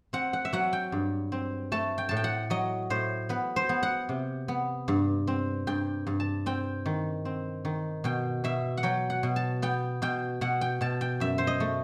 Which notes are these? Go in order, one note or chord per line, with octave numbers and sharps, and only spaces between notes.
C4 F#5
F#5
E5
F#3 F#5
G5
G2
C4
A3 A5
G5
A2 A5
G5
F#5
F#3 D#5
A2 C5
B3 B4
C5
B3
F#5
C3
B3
G2
C4
G2 G5
G2
A5
C4 G5
D#3
C4
D#3
B2 G5
B2 E5
F#5
F#3 G5
F#5
B2
A5
B3 G5
B2 G5
B2 F#5
G5
B2 A5
G5
F#2 E5
C5
D#5
A3